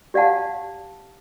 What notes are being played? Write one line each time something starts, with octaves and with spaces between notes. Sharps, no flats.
G4 D5 F5 F#5 A5